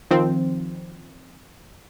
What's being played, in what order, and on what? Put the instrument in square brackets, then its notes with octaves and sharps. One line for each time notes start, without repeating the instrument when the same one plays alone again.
[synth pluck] D#3 F3 C4